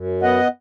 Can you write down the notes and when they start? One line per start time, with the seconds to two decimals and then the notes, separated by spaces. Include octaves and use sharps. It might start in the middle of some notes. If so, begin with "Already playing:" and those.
Already playing: F#2
0.22 B3 D#5 F#5